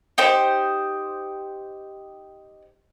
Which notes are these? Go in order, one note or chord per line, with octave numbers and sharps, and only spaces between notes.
D#4 G4 C5